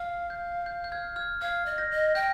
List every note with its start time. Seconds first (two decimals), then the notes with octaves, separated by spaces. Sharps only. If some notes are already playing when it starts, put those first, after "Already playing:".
Already playing: F5 F6
0.30 G6
0.66 G6
0.84 G6
0.92 F6 G#6
1.16 F6 G#6
1.41 F5 F6 G#6
1.66 D#5
1.78 G6 A#6
1.91 D#5
2.15 G5 G6 A#6